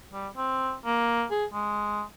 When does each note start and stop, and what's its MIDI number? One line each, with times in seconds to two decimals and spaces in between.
0.12 0.28 55
0.37 0.74 60
0.85 1.24 58
1.31 1.45 68
1.53 2.03 56